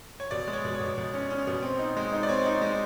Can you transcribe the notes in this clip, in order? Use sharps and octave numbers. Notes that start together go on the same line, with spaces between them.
C#5
B2 D5
G#3
C#5
B2
C#5
B2
B2
C#4
C#4
B2
C4
D#4
G#3
D#4
D5
C4 C#5
D#4
G#3